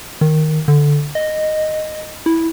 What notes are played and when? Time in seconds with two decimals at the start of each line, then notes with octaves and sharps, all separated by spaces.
0.21 D#3
0.68 D3
1.15 D#5
2.26 E4